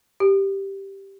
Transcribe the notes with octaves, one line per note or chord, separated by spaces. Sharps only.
G4